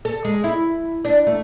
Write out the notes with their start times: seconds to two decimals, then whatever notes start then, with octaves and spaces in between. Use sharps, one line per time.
0.05 A4
0.25 G#3
0.44 E4
1.05 D4
1.27 A3